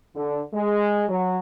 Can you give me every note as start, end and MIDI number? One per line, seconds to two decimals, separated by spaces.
0.16 0.40 50
0.54 1.03 56
1.09 1.38 54